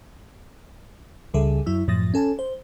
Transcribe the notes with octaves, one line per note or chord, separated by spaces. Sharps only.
C#2 C#3 G3 G#4 A4 E5
F#2 F#3 E4 E6
F#2 A2 F3 D#6 A6 A#6
C#4 A4 G#5 A5
C5